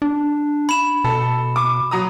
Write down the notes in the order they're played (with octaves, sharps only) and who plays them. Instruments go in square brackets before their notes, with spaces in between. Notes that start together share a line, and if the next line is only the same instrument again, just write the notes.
[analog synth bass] D4
[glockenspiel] B5 E7
[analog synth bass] B2 [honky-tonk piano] A4
[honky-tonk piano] D6
F#3 A#5 D#6